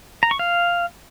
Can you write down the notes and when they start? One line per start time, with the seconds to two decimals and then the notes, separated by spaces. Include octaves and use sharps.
0.23 A#5
0.31 C#6
0.39 F5